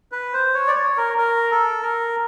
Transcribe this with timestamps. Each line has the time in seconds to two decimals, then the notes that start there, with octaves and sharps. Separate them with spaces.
0.12 B4
0.33 C5
0.54 C#5
0.67 D5
0.75 C#5
0.97 A#4
1.18 A#4
1.51 A4
1.82 A#4